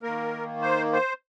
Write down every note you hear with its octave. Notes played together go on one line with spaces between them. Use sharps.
D#3 A#3 A#4
C5
C5